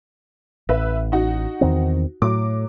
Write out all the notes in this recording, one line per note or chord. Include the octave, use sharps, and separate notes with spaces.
A1 B4 E5
D#4 F#4
E2 D#3 C4
A2 F#3 D6